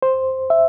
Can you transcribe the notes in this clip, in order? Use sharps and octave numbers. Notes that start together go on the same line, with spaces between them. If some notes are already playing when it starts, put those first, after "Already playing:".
C5
E5